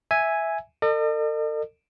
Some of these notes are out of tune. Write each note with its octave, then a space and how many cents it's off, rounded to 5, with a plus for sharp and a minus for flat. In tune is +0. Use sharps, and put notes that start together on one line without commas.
E5 -5 G#5 +0
A4 +45 D#5 -45